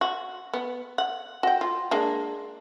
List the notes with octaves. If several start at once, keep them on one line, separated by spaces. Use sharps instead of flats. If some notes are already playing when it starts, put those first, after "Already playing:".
F#4
B3
F#5
F#4 G5
F4
G#3 A#3 D4